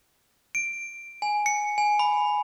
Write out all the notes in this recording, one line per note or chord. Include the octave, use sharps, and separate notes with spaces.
D7
G#5
C#7
G#5
B5